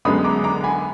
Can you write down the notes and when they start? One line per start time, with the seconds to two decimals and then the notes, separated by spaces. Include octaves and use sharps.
0.05 F#2 D3 G#3 B3 B5 D#6
0.24 A#5 D6
0.44 A#5 D6
0.64 G#5 B5